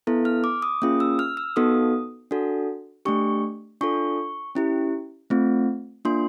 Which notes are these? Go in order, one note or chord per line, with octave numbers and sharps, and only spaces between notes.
B3 E4 A4
F6
D6
D#6
A#3 C#4 F4 G#4 D#6
E6
F6
E6
B3 D#4 F#4 A4 D#6
D4 F#4 A4
A3 D4 G4 C#6
D4 F4 A4 C#6
C#4 E4 G4
A3 C4 F4
A#3 D4 F4 C6